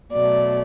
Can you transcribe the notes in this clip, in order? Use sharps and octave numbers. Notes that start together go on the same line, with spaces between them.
B2 F#3 A3 D5